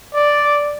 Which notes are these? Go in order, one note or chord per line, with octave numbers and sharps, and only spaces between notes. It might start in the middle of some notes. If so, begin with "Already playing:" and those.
D5